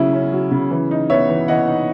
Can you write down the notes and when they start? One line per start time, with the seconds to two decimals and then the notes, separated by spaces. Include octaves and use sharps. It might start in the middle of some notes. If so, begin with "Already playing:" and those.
Already playing: C#3 F#3 C#4 E4
0.13 C#4
0.32 F#3
0.51 C#3
0.71 E3
0.91 D#4
1.10 B3 C#5 E5
1.29 E3
1.48 E3 D#5 F#5
1.68 D#4